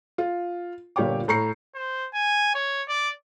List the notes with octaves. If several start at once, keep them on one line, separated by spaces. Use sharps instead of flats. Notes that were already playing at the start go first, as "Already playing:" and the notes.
F4
G1 A#2 G4 C#5 G5 D6
A2 A#5 C#6 C7 C#7
C5
G#5
C#5
D5